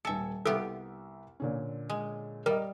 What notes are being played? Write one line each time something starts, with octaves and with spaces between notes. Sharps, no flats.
D#1 A4 E5 G#5 C#7
C2 B3 F4 G4 A4 E5 D7
A#2 D3 C#4
G#3
G3 A#4 D5 D#5